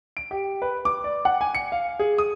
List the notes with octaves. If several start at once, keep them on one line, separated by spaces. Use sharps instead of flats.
D7
G4
B4
D6
D5
F#5
G#5
C#7
F5
G#4
D#6